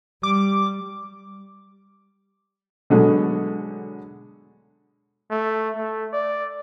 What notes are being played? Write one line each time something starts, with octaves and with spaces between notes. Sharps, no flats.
G3 D6
B2 D3 F#3 G#3 A3
A3
A3
D5